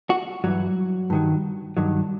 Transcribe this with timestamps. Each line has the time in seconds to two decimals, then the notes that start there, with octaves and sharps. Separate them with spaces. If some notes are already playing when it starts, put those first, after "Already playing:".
0.10 F#4
0.44 G2 E3 F#3
1.10 G2 D#3 F#3
1.77 G2 D#3 F#3